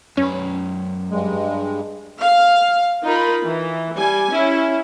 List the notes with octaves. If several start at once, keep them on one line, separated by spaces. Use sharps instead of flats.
F#2 C#4 B4
G2 G#3
F5
D#4 F4 A#4 B5
E3
G3 G#5
C#4 E4